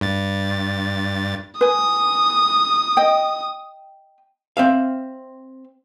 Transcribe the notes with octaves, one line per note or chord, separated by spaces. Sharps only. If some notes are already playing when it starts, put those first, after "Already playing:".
G2 A6
B4 G#5 D#6
D#5 G5
C4 E5 F5